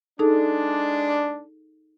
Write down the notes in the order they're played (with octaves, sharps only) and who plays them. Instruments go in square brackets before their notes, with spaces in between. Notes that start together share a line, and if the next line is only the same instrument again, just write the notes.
[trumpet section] G#3 D4 [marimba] D#4 G#4 A4